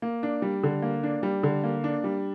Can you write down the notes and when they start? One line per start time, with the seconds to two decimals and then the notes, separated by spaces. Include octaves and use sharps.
0.02 A#3
0.23 D4
0.42 G3
0.63 D3
0.82 A#3
1.03 D4
1.23 G3
1.43 D3
1.64 A#3
1.84 D4
2.04 G3